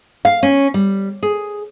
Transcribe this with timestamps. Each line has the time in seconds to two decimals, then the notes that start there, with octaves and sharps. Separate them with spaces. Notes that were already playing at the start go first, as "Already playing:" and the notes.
0.25 F5
0.43 C#4
0.74 G3
1.23 G#4